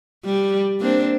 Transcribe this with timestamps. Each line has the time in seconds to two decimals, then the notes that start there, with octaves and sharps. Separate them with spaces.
0.24 G3
0.80 A#3 C4 D4